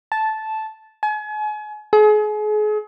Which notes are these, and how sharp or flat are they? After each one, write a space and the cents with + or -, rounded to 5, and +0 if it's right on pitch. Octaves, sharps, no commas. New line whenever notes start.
A5 -10
G#5 +35
G#4 +35